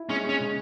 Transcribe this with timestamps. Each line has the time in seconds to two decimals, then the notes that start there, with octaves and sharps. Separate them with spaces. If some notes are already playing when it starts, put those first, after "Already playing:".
Already playing: E4
0.09 G#3 C#4
0.24 G#3 C#4
0.40 C#3